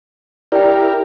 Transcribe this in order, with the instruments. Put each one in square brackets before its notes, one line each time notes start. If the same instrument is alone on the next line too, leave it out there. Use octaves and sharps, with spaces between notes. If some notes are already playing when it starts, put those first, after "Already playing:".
[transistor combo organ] E4 G4 A#4 [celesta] D5 G5